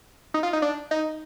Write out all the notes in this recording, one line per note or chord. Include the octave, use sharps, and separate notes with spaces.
D#4
F4
D#4
D4
D#4